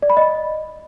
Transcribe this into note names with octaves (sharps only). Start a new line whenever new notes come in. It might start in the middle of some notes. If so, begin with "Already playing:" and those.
D5
B5
D#5